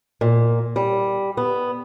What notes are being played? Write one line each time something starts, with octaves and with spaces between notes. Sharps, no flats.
A#2
G3
B3